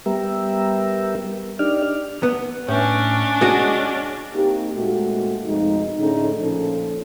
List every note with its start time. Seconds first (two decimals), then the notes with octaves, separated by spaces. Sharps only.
0.06 G3 B3 G4 A#4 E5
1.59 D4 D#4 G4 D5 F6
2.23 B3
2.68 A2 C#4 D4
3.41 G#3 F#4
4.34 A#3 C4 D#4 G4
4.75 A#2 G#3 A3 C4 F#4
5.45 F2 B2 G#3 D#4
6.00 A2 D3 C#4 D#4 G#4 A4
6.40 A#2 F3 C#4 A4